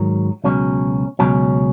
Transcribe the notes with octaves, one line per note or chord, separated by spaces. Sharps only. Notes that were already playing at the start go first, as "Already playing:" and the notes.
Already playing: G#2 D#3 F#3
C#2 B2 F#3 C#4
C#2 B2 F#3 C#4